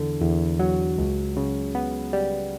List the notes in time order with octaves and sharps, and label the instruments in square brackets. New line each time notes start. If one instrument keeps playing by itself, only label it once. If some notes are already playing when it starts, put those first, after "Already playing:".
Already playing: [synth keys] E2 D3
E2
F#3
C#2
C#3
B3
G3